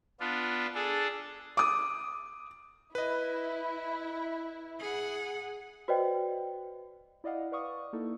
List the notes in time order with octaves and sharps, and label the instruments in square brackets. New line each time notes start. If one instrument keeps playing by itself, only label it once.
[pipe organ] B3 D4 F4
D4 G#4 A4
[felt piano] D6 D#6
[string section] E4 [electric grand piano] B4 D#5
[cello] G#4 F#5
[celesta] F#4 B4 C5 D5 D#5 G5
[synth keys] E4 D5 D#5 F5 F#5
B4 D5 F5 C#6 D#6
A#3 D#4 E4 A4